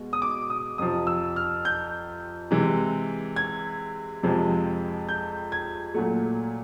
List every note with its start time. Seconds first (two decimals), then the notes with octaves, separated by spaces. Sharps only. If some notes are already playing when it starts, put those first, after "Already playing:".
Already playing: B2 G#3
0.13 D#6
0.22 D6
0.50 D#6
0.78 F2 C3 F3 D#6
1.07 E6
1.36 F6
1.65 G6
2.51 C3 E3 G#3
3.36 G#6
4.23 F2 C3 F3 G#3
5.09 G6
5.52 G#6
5.94 A#2 F#3 A3